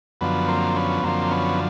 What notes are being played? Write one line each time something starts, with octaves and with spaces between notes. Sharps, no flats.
F#2 D3 F3 B3
A#3 C4
B3 C#4
F#2 D3 F3 A#3 C4
B3 C#4